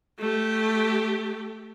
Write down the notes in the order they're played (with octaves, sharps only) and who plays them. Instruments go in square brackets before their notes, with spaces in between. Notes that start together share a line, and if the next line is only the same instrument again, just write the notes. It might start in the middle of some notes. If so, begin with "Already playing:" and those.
[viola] A3 G4